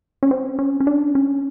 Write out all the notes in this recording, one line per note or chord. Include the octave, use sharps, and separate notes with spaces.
C#4
C4
C#4
C#4
D4
C#4